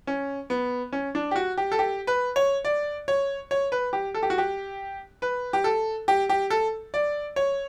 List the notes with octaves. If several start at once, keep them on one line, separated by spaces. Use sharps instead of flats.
C#4
B3
C#4
D4
G4
F#4
G4
A4
G4
B4
C#5
D5
C#5
C#5
B4
G4
A4
G4
F#4
G4
B4
G4
A4
G4
G4
A4
D5
C#5